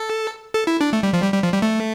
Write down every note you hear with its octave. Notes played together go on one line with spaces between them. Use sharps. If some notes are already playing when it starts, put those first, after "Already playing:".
Already playing: A4
A4
E4
D4
A3
G3
F3
G3
G3
F3
G3
A3